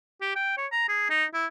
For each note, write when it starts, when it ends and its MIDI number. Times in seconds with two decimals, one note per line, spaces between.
0.21 0.36 67
0.36 0.55 79
0.58 0.67 73
0.72 0.86 82
0.88 1.07 68
1.10 1.25 63
1.34 1.46 64